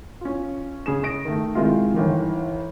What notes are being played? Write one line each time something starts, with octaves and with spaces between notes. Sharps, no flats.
C#4 F4
C#3 G#4 E7
D#6 A#6 D7
D#3 A3
C3 D#3 G#3 E4 F4
G1 D#3 E3